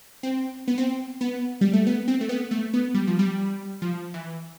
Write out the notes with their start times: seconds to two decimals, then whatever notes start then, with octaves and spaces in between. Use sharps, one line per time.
0.23 C4
0.68 B3
0.78 C4
1.21 B3
1.61 G3
1.73 A3
1.87 B3
2.08 C4
2.21 A3
2.29 B3
2.51 A3
2.74 B3
2.94 G3
3.07 F3
3.19 G3
3.82 F3
4.14 E3